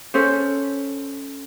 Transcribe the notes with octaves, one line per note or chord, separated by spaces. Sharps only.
C#4 A4 C5